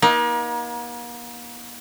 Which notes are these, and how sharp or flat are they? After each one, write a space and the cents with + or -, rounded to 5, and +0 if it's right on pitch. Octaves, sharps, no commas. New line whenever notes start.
A#3 +40 D#4 +30